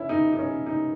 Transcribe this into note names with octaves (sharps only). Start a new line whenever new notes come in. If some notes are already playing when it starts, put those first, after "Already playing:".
Already playing: C#4 E4
D#4
D#4
C#4
D#4